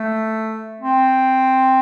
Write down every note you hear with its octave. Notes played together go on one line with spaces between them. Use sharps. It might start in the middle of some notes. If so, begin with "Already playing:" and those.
Already playing: A3
C4